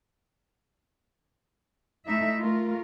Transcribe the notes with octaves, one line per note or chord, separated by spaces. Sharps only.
A3 D#4 E4 E5
A3 F4 A#4